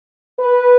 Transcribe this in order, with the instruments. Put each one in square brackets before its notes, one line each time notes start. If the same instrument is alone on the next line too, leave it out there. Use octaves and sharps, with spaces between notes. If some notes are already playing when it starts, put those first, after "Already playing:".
[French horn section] B4